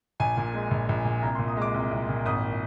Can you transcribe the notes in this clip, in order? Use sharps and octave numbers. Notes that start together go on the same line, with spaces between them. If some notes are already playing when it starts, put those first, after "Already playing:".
A#1 G#5
A#2
G#3
A#1
A#1
A#2
C2 A#5
A#2 C6
D#6
G#3 D6
C2
C2
A#2
G#1 D#6